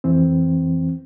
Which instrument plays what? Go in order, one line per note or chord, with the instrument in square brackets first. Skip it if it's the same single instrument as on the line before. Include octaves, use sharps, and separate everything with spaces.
[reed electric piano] F2 E3 C4